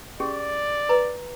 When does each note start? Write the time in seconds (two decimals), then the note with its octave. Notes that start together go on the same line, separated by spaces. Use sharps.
0.20 C#4 G4 G#4 D5
0.89 B4 A#5